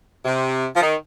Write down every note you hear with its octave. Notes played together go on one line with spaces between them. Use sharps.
C3
F3
D#3